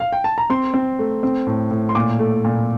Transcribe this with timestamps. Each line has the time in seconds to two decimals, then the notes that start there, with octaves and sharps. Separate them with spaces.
0.00 F5
0.12 G5
0.24 A5
0.38 A#5
0.50 C4 C6
0.74 C4
0.99 A3
1.23 C4
1.47 A2
1.71 A2
1.89 C6
1.95 A#2 D6
2.19 A3
2.45 A#2